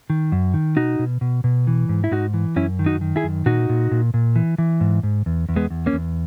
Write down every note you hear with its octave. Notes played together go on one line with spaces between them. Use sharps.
D#3
F#2
D#3
B2 D#4 F#4
B2
B2
B2
E3
G#2
E4
G#2 D#4 F#4
E3
F#2 C#4 E4
D#3
D#4 F#4
D#3
E4 G#4
F#2
A#2 D#4 F#4
A#2
A#2
A#2
E3
E3
G#2
G#2
E2
E2
G#3 B3
E2
A#3 C#4
E2